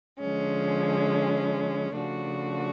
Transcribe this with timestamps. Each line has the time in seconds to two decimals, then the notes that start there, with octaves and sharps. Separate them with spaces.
0.19 D3 F3 G#3 C#4
1.95 C#3 F3 A3 D4 F#4